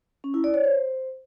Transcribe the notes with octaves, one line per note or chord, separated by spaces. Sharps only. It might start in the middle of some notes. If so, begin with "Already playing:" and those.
C#4
E4
D5
C#5
C5